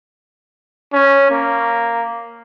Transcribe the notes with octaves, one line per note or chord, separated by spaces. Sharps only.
C#4
A#3